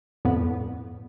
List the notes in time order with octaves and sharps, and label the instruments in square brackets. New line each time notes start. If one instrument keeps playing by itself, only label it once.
[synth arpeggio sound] F2 A2 B3